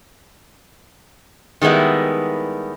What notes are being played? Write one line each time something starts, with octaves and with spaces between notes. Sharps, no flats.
D#3 G3 G#3 B3 E4